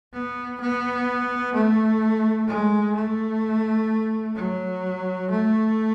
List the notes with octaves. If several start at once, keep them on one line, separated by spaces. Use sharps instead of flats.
B3
B3
A3
G#3
A3
F#3
A3